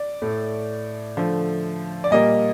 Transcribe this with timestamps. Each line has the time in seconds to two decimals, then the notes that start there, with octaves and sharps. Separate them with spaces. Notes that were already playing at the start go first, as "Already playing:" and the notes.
Already playing: D5
0.22 A2 A3
1.17 D3 F3 A3
2.04 D5
2.11 A#2 G3 A#3 D#5